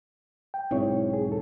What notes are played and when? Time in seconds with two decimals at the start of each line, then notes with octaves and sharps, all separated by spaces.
0.54 G5
0.71 B1 G#2 C4 E4 C#5
1.13 G#4
1.28 E2 A4